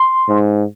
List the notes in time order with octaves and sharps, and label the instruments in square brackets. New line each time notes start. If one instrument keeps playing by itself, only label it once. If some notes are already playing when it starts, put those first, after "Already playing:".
Already playing: [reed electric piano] C6
[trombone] G#2